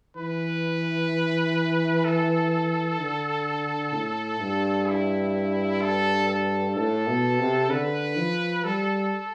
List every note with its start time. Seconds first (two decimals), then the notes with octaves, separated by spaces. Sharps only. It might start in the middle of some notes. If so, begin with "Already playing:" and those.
0.16 E3 B4
2.05 A4
2.99 D3
3.93 A2
4.40 G2
4.87 E4
5.82 A4
6.28 A4
6.76 A2 A4
7.07 B2
7.39 C3
7.71 D3 B4
8.17 F3
8.64 G3 A4